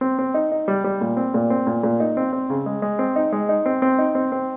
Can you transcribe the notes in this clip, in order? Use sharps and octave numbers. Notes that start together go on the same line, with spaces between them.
C4
C4
D#4
D#4
G3
G3
A#2
C4
A#2
C4
A#2
A#2
D#4
C4
C4
C#3
G#3
G#3
C4
D#4
G#3
D#4
C4
C4
D#4
C4
C4